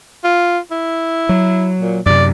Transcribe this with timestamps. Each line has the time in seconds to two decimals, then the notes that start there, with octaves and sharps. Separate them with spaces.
0.24 F4
0.71 E4
1.29 F#3
1.81 A#2
2.06 F#2 C3 D5